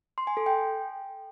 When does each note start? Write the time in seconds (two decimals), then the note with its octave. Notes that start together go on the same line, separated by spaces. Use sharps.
0.18 C6
0.27 G#5
0.37 A4
0.46 G5